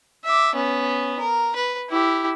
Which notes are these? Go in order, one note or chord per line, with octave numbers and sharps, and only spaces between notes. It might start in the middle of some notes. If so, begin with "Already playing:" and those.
E5 D6
B3 C#4
A#4
B4
E4 G4